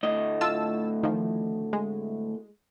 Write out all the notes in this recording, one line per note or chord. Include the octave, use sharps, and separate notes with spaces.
D2 A2 D#5
F4 A5 E6
D#3 F3
G#3